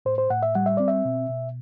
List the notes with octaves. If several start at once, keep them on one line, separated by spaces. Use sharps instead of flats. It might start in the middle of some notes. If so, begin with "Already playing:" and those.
A2 C5
C5
A2 F#5
E5
G3 F#5
E5
C4 D5
E5
B2
B2